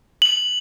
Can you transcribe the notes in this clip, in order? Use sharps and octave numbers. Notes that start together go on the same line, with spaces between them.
F#7